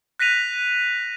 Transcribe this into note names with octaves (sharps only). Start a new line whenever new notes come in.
F#6 A#6 B6 D#7 F7